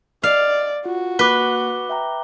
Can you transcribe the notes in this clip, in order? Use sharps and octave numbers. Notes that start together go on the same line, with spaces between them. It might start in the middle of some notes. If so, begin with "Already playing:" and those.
D5 D#5 F5
F4 F#4
A#3 B4 D6 F#6 B6 G7
E5 G5 A#5